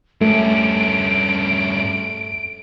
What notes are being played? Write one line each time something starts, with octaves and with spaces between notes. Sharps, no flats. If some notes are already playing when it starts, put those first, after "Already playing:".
G2 A3 C#4 D7